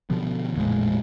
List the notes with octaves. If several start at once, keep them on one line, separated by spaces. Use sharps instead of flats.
B2 D3 F3 B3
A1 F2 A#2 G#3